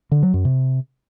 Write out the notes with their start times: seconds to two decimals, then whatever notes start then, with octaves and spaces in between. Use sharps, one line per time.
0.12 D3
0.23 F#3
0.34 F#2
0.45 C3